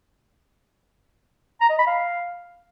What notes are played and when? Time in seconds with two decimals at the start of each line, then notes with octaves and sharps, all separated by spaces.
1.61 A#5
1.70 D#5
1.79 B5
1.87 F5